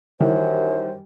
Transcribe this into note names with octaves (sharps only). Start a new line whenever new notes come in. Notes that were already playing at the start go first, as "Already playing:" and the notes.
F#2 D#3 E3 G3 C5